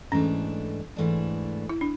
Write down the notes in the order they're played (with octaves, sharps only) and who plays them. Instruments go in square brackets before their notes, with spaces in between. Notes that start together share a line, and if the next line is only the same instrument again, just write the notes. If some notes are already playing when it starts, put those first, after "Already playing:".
[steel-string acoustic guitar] G#2 E3 A3 D4 [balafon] C#4
[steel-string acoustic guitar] G#2 E3 A3 D4
[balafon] E4
D4